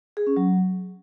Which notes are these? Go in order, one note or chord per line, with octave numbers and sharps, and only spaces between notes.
G#4
C#4
F#3